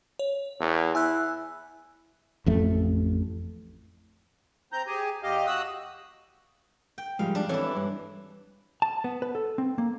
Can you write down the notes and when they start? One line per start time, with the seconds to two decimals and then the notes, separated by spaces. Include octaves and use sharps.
0.19 C#5
0.60 E2
0.95 E4 G#5 E6 F#6
2.46 A1 F2 A3
4.72 C4 A#5 G6
4.87 G4 G#4 G#5
5.23 E2 G4 D#5 F5
5.47 F#4 D#6 E6 F#6
6.98 G5
7.19 G#2 F3 G3 F5
7.35 D4
7.49 E3 C4 E4 A4 C#5
7.77 G2
8.82 A5
9.04 B3
9.22 B4
9.35 A4
9.58 C4
9.78 A#3